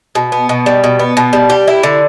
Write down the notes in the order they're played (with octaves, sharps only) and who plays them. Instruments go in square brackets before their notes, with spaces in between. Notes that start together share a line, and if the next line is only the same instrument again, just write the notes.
[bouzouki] B2
B3
B2
G3
B2
B3
B2
G3
G4
E4
D3